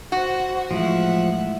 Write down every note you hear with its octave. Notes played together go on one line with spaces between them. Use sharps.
F#4 C5 F#5
A2 E3 F3 G#3 E5 F#5